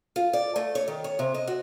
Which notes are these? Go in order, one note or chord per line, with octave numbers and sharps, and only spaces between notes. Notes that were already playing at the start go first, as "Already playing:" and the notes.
F4
D5
A3
C#5
D#3
C#5
C3
D#5
F#4